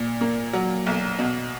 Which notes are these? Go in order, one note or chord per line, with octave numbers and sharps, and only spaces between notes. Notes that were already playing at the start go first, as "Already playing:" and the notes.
Already playing: A#2
A#3
F#3
B1
B2